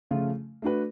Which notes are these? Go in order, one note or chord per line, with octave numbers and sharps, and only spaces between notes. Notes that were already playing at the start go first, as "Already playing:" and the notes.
C#3 F3 A3 C#4 F4
A3 D4 F#4 B4